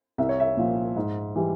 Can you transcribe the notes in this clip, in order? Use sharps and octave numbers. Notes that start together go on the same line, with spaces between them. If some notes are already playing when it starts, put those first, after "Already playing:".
C2 E5
C#5
E5
A#2 F3
G#2
E3 G3